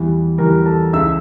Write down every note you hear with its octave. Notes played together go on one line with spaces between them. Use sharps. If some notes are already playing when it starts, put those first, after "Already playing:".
Already playing: E2 E3 G3
E2 E3 G3 A#4 A#5
A4 A5
C#2 C#3 E3 E5 E6